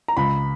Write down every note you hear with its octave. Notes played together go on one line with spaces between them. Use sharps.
A#5
C#2 B5